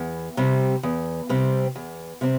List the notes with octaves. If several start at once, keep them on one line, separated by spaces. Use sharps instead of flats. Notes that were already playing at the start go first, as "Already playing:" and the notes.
Already playing: E2
C3 G3 C4
E2
C3 G3 C4
E2
C3 G3 C4